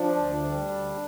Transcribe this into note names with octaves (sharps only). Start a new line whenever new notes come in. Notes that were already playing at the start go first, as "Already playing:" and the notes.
Already playing: F3 D4
D2
G3
D2